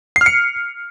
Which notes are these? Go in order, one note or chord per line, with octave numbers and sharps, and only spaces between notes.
C7
F6
C#7